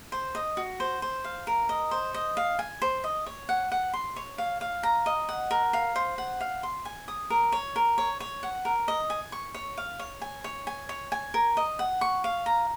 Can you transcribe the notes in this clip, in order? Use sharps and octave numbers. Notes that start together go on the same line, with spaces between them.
C5
D#5
F#4
C5
C5
F5
A#4
D#5
C5
D#5
F5
G#5
C5
D#5
C#5
F#5
F#5
C6
C#5
F5
F5
A#5
D#5
F#5
A#4
F5
C5
F#5
F5
C6
G#5
D#6
A#4
C#5
A#4
C#5
C#5
F#5
A#4
D#5
G#5
C#6
C#5
F5
C#5
G#5
C#5
G#5
C#5
G#5
A#4
D#5
F#5
C#6
F5
A#5